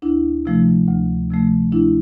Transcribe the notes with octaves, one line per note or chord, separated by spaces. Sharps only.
D2 D4 E4
C3 F3 A3
D2
C3 F3 A3
D2 D4 E4